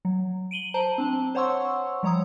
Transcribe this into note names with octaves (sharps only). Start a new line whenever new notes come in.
F#3
D7 D#7 F#7 G7
C5 A5 A#5
C4 D4 A5
C5 C#5 F#5 C6 C#6 E6
F3 G3 C#5 A#5 D#6